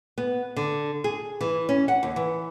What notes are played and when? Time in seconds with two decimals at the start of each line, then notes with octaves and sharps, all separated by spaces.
0.18 B3
0.57 D3
1.04 G#4
1.41 E3
1.69 C#4
1.88 F#5
2.03 D#2
2.16 E3